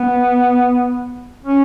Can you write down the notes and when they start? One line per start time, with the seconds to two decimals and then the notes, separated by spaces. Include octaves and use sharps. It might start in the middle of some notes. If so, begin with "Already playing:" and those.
Already playing: B3
1.44 C#4